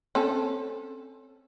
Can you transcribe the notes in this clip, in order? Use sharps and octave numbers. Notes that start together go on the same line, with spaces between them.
C4 C#4 A4